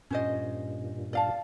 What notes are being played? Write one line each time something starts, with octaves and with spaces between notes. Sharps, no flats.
G2 A#2 C#4 C5 D#5
D5 F5 A5